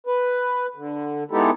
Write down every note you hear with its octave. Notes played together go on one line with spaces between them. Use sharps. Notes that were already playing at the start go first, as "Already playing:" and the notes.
B4
D3
G#3 B3 D#4 E4 G4 A4